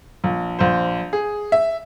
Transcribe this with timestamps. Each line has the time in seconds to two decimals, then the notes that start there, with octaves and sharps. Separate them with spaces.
0.24 A#1
0.59 A#1 C5
1.13 G#4
1.52 E5